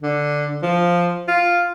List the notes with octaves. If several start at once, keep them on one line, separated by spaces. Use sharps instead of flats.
D3
F3
F4